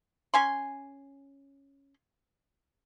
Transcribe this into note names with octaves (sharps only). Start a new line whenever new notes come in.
C#4 G#5 C6